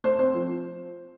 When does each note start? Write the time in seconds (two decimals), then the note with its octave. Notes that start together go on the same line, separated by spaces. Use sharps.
0.04 A3 C5
0.19 C4 C5
0.34 F3